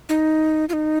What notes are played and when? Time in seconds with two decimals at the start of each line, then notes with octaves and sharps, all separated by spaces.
0.09 D#4
0.69 F4
0.73 D#4